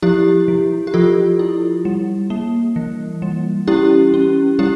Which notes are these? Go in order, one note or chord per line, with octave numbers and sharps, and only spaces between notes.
F3 E4 G4
F3
G4
F3 F4 A4
E4
G3
A#3
E3
G3
C#4 E4 G4
C#4
G3 E4 G4